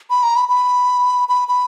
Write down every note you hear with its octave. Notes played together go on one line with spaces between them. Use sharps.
B5
A#5
B5
B5
B5
B5